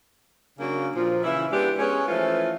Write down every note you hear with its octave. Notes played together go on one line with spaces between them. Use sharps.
C#3 F#3 A#3 D4
A#2 F3
C#3 E3 E4
G#3 B3 D4 G4
G#3 B3 C#4 G#4 C#5
E3 F3 A3 C#4 F4